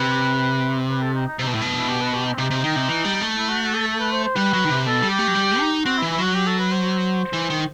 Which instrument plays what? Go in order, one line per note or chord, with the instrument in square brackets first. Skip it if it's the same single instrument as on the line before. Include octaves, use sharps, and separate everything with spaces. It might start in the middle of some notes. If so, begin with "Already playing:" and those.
Already playing: [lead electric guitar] C3 [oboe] B4
[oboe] B4
A4
D#4
D#4
[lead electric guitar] C3 [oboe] D#4
[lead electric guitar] B2
[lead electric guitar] A2 [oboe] E4
[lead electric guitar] B2
[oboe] E4
G4
B4
G4
D#4
C4
[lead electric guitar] C3 [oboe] D#4
[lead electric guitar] C3
D#3
C3
E3
G3
A3
[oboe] E4
F#4
F#4
A4
A4
B4
C5
C5
[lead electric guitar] G3 [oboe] B4
[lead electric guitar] F#3
D#3
C3
[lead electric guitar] B2 [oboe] A4
[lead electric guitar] G3
[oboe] G4
[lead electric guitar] A3
F#3
G3
D#4
[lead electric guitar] C4 [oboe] F#4
[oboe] E4
[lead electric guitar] E3
[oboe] E4
[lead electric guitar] F#3 [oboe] F#4
[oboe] G4
A4
B4
C5
[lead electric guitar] E3
D#3